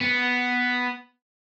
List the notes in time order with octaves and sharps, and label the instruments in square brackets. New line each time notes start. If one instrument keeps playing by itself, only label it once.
[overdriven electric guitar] B3